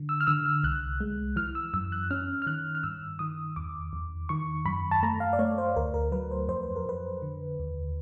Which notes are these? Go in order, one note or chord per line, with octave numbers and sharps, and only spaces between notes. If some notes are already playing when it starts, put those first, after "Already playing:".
Already playing: D3
E6
F6
D3 E6
F6
C2 F#6
G#3
E3 F6
E6
F#2 E6
F#6
C#4 F6
F6
D#3 F#6
F6
G2 E6
D#3 D#6
E2 D6
E2
D#3 C#6
F#2 B5
A5
A3 A#5
F5
D5
A3 C#5
C5
D2 A#4
A#4
F#3 B4
C5
F2 C5
B4
A#4
F2 B4
D3
D#2